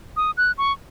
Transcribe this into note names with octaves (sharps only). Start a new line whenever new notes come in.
D#6
F#6
C#6